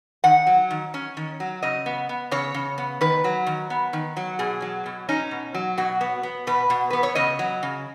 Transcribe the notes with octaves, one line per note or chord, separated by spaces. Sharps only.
D#3 F#5
F#3
D#3
C#4
D#3
F#3
C#3 D#5
B3
B3
C#3 C#5
C#3
B3
D#3 B4
F#3
D#3
B3
D#3
F#3
B2 G#4
F#3
B2
C#4 D#4
B2
F#3
B2 F#4
B3
B3
B2 B4
B2
B3 B4
C#5
C#3 D#5
F#3
C#3